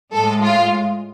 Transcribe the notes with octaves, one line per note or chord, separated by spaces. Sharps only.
A2 G#3 A4
F4